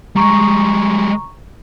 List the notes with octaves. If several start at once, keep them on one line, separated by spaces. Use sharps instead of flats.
G3 G#3 A#5 C#6